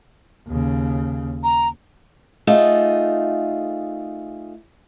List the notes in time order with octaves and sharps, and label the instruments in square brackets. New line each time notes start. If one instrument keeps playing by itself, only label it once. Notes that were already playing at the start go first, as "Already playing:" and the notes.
[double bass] D#2 C#3
[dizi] A#5
[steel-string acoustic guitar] A3 D#4 F4 G#4